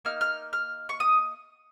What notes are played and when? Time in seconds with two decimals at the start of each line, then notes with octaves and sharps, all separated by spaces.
0.05 A#3 D#4 F6
0.21 F6
0.53 F6
0.89 C#6
1.00 D#6